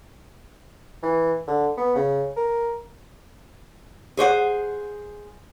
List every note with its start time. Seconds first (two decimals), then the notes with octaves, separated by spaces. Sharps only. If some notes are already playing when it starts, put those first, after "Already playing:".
1.03 E3
1.48 D3
1.77 B3
1.96 C#3
2.37 A#4
4.17 G#4 C5 C#5 F#5